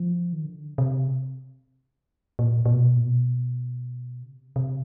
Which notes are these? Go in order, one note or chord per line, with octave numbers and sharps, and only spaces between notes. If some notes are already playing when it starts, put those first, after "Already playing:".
Already playing: F3
D#3
D3
C3
A#2
A#2
B2
A#2
B2
C#3
C3
C3